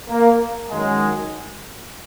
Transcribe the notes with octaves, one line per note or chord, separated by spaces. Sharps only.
A#3
F#2 D#3 F#3 G#3